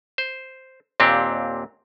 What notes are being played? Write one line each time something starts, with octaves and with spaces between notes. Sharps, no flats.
C5
D#2 A#2 C4 D4 G4